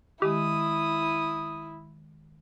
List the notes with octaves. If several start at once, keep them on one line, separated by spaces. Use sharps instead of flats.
D#3 G#3 E4 G4 D#6